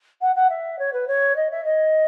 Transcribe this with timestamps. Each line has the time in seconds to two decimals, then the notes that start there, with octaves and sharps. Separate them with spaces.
0.21 F#5
0.35 F#5
0.50 E5
0.79 C#5
0.93 B4
1.08 C#5
1.36 D#5
1.51 E5
1.65 D#5